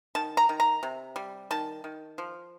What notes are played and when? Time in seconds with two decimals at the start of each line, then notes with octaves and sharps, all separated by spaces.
0.15 D#3 A5
0.37 A#5
0.49 D#3
0.60 A#5
0.83 C3
1.16 G3
1.51 D#3 A5
1.84 D#3
2.18 F3